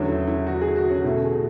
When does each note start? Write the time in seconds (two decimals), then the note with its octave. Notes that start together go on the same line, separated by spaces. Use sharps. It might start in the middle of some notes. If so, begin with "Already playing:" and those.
Already playing: E2 D3 F#3 A3 C#4
0.08 E4
0.28 E4
0.47 F#4
0.61 G#4
0.76 F#4
0.90 C#4
1.04 B2 A3 E4
1.24 G#4